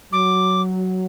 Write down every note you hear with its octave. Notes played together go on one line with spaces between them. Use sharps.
F#3 D6